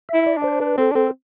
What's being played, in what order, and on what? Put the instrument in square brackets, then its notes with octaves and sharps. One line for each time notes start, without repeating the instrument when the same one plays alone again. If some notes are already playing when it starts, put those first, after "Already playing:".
[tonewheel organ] E5
[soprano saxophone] E4
[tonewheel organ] D5
[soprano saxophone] D4
[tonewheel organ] C5
[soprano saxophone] D4 [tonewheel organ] B4
[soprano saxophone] C4 [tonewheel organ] A4
[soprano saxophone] D4
[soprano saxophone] C4 [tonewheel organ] A4